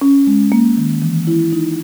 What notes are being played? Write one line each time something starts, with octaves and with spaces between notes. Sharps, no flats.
C#4
G#3
A#3
D#3
E3
E4
D#4